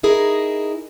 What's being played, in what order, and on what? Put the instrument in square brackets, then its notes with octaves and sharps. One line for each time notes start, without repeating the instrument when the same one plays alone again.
[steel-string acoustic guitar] D#4 E4 G#4 A#4